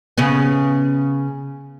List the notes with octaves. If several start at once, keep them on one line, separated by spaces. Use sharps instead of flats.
C#3 B3